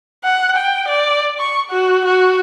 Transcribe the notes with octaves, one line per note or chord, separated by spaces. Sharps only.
F#5
G5
D5
C#6
F#4
F#4